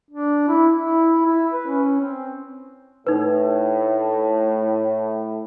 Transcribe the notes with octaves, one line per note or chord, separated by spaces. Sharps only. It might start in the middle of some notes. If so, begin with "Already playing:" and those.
D4
E4
E4
E4
B4
C#4
C4
A2 D#4 B4